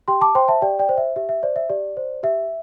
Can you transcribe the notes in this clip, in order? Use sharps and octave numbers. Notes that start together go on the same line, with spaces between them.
G4 G5 C6
A5 D6
C5 G5 C6
E5 A5
G4 D5 G5
D5 G5
C5
E5
G4 E5
E5
C5 D5
E5
G4 D5
C5
G4 E5